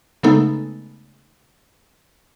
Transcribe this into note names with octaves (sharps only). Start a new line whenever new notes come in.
C#3 G#3 A3 B3 D#4 A4